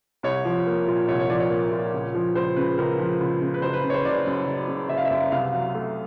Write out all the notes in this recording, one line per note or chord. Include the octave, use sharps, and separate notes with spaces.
C2 C#5
F3
A#3
A#2
C2 C#5
C#5
F3 D5
C#5
A#3
A#2
C#2
F3
C#2 C5
C#3 B4
C#2 A#4
F3
C#2
C#3
B4
F#1 C5
B4
C#3
C#5
C5
F#1 D5
F#2
F#1
C#3
F#1 E5
F5
E5
F#2
C2 F5
F#3
A3